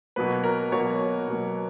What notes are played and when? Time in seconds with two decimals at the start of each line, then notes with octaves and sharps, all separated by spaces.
0.16 B2 F#3 A#3 B4
0.44 A#4
0.72 B2 F#3 A#3 C#5
1.28 B2 F#3 A#3